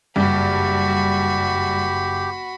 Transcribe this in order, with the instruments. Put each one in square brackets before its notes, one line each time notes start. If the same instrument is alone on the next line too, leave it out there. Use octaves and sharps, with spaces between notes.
[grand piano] F#1 [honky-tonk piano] G2 [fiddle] F#4 B5 [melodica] G4